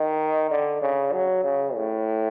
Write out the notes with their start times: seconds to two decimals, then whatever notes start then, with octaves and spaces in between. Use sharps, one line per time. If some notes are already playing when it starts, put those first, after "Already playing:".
Already playing: D#3
0.50 D3
0.81 C#3
1.12 F#3
1.43 C#3
1.75 A2